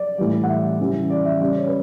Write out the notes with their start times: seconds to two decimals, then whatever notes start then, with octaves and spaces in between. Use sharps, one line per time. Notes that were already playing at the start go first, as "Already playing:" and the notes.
Already playing: D5
0.18 A2 E3 G3
0.43 F#5
0.49 E5
0.79 C#3 E3 G3
1.10 D5
1.25 E5
1.41 C#3 G3 D5
1.56 C#5
1.67 B4